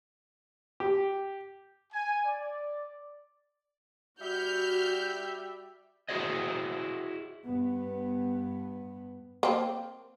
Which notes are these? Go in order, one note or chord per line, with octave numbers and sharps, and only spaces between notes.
G4
G#5
D5
G3 F#4 D5 E5 F6 G6
E4 F#4 G#4 C5 C#5 D#5
G2 B3
A#3 C4